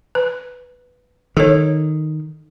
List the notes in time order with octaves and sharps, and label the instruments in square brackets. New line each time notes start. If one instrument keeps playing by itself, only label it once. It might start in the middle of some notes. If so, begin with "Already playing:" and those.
[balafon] B4
[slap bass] D#3 [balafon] A4 C#5